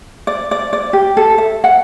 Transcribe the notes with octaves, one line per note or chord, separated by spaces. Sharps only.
D5
D5
D5
G4
A4
E5
F#5